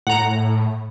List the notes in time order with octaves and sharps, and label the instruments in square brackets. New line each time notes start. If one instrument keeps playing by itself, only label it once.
[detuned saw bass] A2 [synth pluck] F#5 A#5